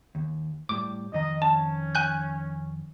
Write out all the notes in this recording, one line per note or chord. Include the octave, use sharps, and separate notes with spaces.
D#2
A2 G3 D6
F2 D#3 D#5 A#5
C#4 A5
G#5 F#6 G6